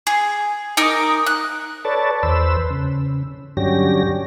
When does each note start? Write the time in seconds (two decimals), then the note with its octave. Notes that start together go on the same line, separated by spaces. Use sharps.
0.07 G#4
0.77 D#4 A#4 D6 D#6
1.26 F#6
1.85 A4 B4 C#5 D5 A5
2.23 E2 B4 C5 E6
2.71 C#3
3.57 G2 D3 F#3 C#4 G4 A#6